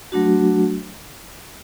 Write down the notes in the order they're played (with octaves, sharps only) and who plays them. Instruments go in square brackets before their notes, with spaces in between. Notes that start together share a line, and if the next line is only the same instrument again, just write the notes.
[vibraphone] F#3 A3 D4 F#4